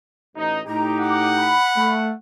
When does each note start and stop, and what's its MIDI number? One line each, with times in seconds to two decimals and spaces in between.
0.36 0.60 33
0.36 0.60 63
0.66 1.54 45
0.66 1.54 63
0.66 1.54 67
0.66 1.00 82
1.00 2.15 78
1.00 1.28 86
1.37 1.96 83
1.77 2.11 57